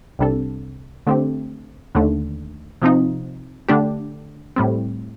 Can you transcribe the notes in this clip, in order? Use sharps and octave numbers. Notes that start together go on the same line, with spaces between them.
C2 C3 G3 D4 A4
D3 A3 C4 G4
D#2 D3 A3
C3 F3 C4 D#4
D3 A3 D4 G4
A2 G3 C4